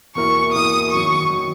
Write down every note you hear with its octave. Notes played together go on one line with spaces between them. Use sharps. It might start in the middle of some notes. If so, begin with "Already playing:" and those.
E2 B2 A#3 E4 A#4 C#6
E2 B2 A#3 E4 A#4 D#6
F#2 D#3 F#3 C#6
D#3 F#3